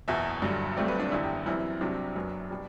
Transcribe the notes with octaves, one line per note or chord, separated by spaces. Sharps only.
F#1 E2 B2 E5
G1 G2 D3 F#3
G1 G2 F#3 A3 C4 D5
B4
D4
F#1 E2 D3 E4
G4
F#2 E3 G3 C4 E4
C2 C3 F#3 C4 D4
F#1 F#2 F#3 B3
B2 G3